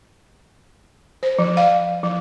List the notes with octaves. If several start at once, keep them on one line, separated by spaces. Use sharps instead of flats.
C5
F3
F5
F3